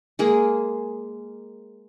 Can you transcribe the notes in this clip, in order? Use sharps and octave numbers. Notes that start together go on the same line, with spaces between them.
G#3 A#3 G#4